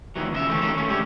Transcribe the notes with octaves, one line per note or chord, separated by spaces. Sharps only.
A#2 D#3 E3 F#3
C#3 D#5 E5
E3 A3 C4 C#4
D#3 F#3 A#3 C#4 A4
A3 C#4
C#2 A2 D3 C#4 G4 E5